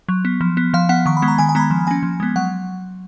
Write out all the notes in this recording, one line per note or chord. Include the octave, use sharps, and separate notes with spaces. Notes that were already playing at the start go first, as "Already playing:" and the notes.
F#3
B3
F3
B3
F3 F5
B3 F#5
D#3 C#6
B5
G#3 B3
A#5
D#3 G#5
G#5
G#3 B3 A#5 B5
F3
A#3 C#4 G#5
F3
G#3 B3
F#3 F#5